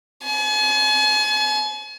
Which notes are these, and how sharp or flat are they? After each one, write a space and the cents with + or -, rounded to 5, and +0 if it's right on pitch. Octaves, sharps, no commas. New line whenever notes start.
G#5 +40